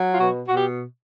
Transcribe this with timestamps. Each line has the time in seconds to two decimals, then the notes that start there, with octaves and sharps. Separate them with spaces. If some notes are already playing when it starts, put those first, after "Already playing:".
Already playing: F#3
0.14 F4
0.20 B2 F#4
0.47 B2 F#4
0.56 G4